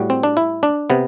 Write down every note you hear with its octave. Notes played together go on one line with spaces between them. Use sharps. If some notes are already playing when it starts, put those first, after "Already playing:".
Already playing: A2 G3 F#4
C4
D4
E4
D4
C3 B3